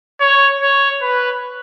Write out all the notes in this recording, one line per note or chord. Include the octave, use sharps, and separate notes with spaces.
C#5
C#5
B4